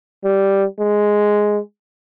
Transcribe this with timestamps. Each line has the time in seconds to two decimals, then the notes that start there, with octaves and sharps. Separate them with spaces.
0.24 G3
0.80 G#3